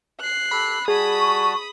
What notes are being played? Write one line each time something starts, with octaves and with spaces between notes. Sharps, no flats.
F#6 C7
G4 A4 B5
G3 F#4 G#4 A5 B5 D#6
C#6